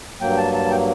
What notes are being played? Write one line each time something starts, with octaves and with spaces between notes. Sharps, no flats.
G2 F#3 A#3 G5
A5
A5
G5